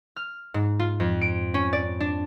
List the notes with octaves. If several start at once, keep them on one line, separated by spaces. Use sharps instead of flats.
F6
G#2
F4
F2
D7
C#4
D5
D4